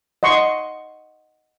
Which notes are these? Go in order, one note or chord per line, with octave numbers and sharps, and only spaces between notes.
D#5 F#5 C6 C#6